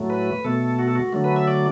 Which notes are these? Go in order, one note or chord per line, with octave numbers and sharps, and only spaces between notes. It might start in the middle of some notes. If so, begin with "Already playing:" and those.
Already playing: A2 F#3 A3
B4
B2 A3 A4
F#4
A4
F#4
D3 F#3 A3
B4
E5
D5